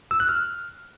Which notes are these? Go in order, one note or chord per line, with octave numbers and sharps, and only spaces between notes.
E6
F#6
F6